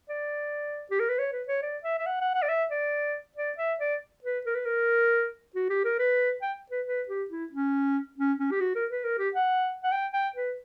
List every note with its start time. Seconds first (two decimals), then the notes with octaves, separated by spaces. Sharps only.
0.09 D5
0.91 G4
1.00 A#4
1.09 B4
1.19 C#5
1.32 B4
1.48 C#5
1.62 D5
1.83 E5
1.99 E5
2.06 F#5
2.21 F#5
2.34 F#5
2.42 D5
2.49 E5
2.71 D5
3.36 D5
3.58 E5
3.80 D5
4.24 B4
4.46 A#4
4.55 B4
4.65 A#4
5.55 F#4
5.70 G4
5.84 A#4
5.99 B4
6.42 G5
6.71 B4
6.86 B4
7.08 G4
7.30 E4
7.52 C#4
8.18 C#4
8.39 C#4
8.51 G4
8.60 F#4
8.75 A#4
8.90 B4
9.04 A#4
9.19 G4
9.34 F#5
9.84 F#5
9.92 G5
10.13 G5
10.36 B4